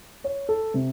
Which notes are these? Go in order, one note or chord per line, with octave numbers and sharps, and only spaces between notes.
C#5
A4
C3